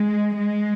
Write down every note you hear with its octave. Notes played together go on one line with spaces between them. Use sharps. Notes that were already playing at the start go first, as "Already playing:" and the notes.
Already playing: G#3
G#3